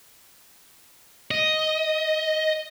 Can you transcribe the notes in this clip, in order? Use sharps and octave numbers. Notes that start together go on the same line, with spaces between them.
D#5